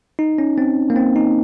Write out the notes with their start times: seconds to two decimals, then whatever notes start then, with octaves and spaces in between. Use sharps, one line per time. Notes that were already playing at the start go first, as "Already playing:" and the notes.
0.19 D#4
0.38 C#4
0.58 C4
0.90 A#3
0.96 C4
1.16 D#4